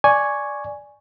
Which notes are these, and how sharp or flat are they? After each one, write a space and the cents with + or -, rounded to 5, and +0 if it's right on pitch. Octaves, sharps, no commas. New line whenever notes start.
D5 +0 G#5 +0 C#6 +0